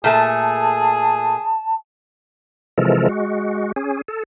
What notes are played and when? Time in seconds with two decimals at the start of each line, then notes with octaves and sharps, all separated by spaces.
0.04 A#2 A3 G#4 A5
2.78 C3 E3 F3 G#3 A4 A#4
3.09 G#3 F#4
3.76 C#4 G#4
4.08 A4